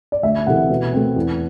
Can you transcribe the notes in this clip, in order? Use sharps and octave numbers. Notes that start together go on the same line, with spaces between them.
D5
D2 E5
C3 E3 A3 F#5
B2
A3 C4
E2